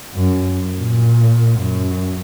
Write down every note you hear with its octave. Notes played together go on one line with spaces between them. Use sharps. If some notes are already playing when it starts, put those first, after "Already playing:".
F#2
A#2
F#2